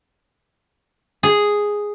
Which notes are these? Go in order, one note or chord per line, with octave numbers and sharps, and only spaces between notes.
G#4